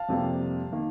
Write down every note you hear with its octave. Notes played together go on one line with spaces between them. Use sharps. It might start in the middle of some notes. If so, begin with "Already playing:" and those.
Already playing: F5 A5
F2 C3 G3 A#3
D#3 A#3